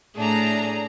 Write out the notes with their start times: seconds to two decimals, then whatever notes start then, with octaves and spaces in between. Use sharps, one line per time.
0.17 A2 A3 D4 G#4 D5 A#5